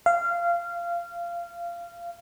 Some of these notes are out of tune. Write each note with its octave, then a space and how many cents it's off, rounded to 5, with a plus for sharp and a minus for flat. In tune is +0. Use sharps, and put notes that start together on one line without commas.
F5 -20